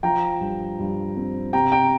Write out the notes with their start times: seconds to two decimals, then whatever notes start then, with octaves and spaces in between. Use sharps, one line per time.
0.03 F3 G5 A#5
0.40 G2
0.79 G2
1.17 C4
1.53 C3 G5 A#5
1.72 G5 A#5